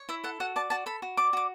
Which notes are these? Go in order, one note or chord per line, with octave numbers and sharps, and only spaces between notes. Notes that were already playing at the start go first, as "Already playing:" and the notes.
Already playing: C#5
E4 E5
A4 F#5
F#4 F#5
D5 A5
F#4 A5
A4 B5
F#4
D5 D6
F#4 D6